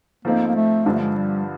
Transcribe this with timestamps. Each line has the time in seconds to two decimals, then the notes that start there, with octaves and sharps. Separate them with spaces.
0.25 G#2 F3 A3 A#3 C4 D#4
0.47 A#3
0.55 A3
0.86 G2 D3 F3 G#3
0.93 A3
1.00 G#3
1.16 G3